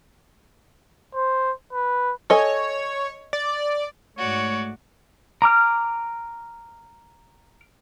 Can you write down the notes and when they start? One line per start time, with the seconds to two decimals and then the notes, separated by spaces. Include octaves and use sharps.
1.15 C5
1.73 B4
2.30 A4 C#5 D#5 G#5
3.33 D5
4.18 G#2 A3 F#4 C#5 D5
5.42 A#5 D6 F6